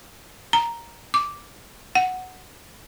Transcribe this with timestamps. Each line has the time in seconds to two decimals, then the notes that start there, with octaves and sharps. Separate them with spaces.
0.53 A#5
1.14 D6
1.95 F#5